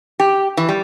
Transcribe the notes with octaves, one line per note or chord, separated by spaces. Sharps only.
G4
E3
G3